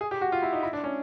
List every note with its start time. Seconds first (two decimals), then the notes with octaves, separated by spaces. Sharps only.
0.01 G#4
0.11 G4
0.21 F#4
0.32 F4
0.43 E4
0.53 D#4
0.63 E4
0.73 D4
0.84 C#4